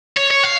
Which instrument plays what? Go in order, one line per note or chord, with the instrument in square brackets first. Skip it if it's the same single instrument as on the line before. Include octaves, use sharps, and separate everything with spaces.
[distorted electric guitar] C#5
C#5
F5